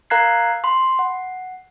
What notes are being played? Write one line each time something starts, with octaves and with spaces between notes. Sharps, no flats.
A#4 F5 A#5 F#6 G#6 C7
B5 C6
F#5